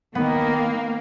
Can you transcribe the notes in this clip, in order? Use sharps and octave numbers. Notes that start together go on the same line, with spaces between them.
D#3 A#3 B3